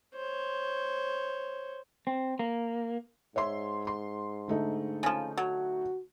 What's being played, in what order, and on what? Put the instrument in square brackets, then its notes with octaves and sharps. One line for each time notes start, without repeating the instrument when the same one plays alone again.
[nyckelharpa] C5 C#5
[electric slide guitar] C4
A#3
[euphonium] G#2 [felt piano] C#5 E5 C6
[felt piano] C6
D3 A3 D#4
[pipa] C#3 F3
[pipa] F#3 [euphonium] F#4